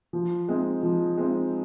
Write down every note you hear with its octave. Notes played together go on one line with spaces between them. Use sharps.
F3
G#3 C4 D#4
F3
G#3 C4 D#4